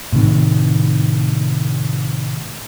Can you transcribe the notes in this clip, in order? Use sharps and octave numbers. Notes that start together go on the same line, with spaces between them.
A2 C3 D#3